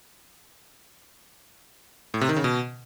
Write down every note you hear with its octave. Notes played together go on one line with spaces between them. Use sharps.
A2
C3
D#3
C#3
B2